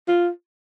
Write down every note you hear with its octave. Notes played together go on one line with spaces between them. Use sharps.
F4